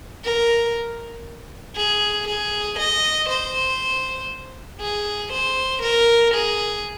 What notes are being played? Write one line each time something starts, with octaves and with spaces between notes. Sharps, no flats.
A#4
G#4
G#4
D#5
C5
G#4
C5
A#4
G#4